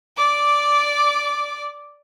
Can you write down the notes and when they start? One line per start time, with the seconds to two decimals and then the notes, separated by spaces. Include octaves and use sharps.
0.17 D5 D6